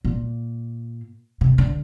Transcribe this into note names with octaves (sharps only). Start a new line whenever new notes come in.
A#2
C3
D3